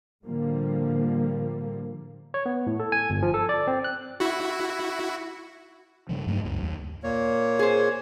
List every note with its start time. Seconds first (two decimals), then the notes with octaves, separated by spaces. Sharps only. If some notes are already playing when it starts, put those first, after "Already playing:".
0.24 A2 D3 F3 G3 A#3
2.34 C#5
2.46 B3
2.67 A2
2.80 A4
2.92 G#5
3.10 G1
3.22 F3
3.34 A4
3.49 D5
3.67 C4
3.84 F#6
4.20 E4 F#4
6.09 G2 C#3 F3
6.27 G2 F#3 A3
6.45 C#2 F#2
6.63 D#2
7.03 A#2 A#3 C#5
7.59 G#4 C5